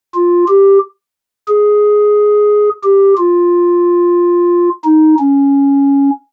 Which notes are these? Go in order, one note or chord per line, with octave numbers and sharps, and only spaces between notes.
F4
G4
G#4
G4
F4
D#4
C#4